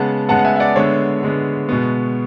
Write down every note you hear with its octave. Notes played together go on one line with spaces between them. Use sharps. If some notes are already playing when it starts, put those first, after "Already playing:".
Already playing: C#3 G#3 B3 F#5 A5
C#3 G#3 B3 F#5 A5
F#5
E5 G#5
E5
D5 F#5
D3 G#3 B3 C#5 E5
D3 G#3 B3
B2 G#3 B3